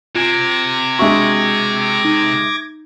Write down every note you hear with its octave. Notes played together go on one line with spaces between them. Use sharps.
C3 F4 G#5 D6 G#6 A#6
G#3 D4 F#4 E5 C#6
D#4